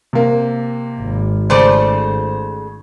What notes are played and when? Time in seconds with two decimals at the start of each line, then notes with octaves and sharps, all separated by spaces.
0.13 C3 A#3
1.00 G#1
1.50 C#3 A3 C5 D5